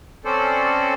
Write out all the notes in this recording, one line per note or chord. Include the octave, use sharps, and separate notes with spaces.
C4 C#4 A4 C5 D5